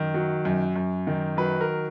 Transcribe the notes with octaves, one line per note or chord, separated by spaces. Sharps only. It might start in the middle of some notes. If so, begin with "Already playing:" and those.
Already playing: F#2 D#3
F#3
F#2
F#2
D#3
F#3 B4
A#4